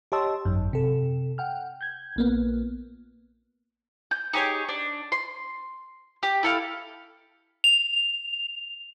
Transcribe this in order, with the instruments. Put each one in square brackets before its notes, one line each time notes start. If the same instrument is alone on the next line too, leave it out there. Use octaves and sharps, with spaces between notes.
[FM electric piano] G4 C#5 D#5 A5 C6 E6
G#1 F#2
C3 A4
F#5 G5 F6
G6 G#6
A#1 A#3 B3
[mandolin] G6
D#4 G4 G#4 C#5
D4
C6
G4
E4 A4 F5
[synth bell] F7